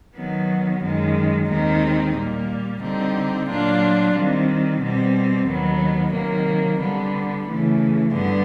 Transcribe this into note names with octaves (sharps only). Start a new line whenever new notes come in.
D#3 F#3 B3
F#2 D#3 G#3
D#2 D#3 G#3 C4 D#4
A#2 G3 A#3
D3 G3 C4 D#4
A#2 F#3 A#3 D4 F4
D#3 G3 C4
B2 G3 C4
D#2 D#3 F#3 B3
C3 D#3 F#3 A#3
D3 G3 B3
C#3 E3 A3
G2 D3 G3 B3